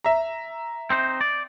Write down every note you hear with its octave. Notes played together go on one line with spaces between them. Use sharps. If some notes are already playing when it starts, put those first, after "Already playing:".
E5 A#5
C4 D#4 C5
D5